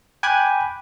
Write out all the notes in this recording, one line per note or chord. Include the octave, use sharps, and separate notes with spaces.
G5 G#5 B5 D6 F#6 G#6